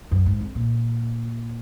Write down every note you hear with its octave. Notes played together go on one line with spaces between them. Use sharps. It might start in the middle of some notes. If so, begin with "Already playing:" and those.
F#2
G#2
F2
A#2